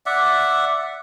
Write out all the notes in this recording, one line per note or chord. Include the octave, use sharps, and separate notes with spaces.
D5 E5 F#5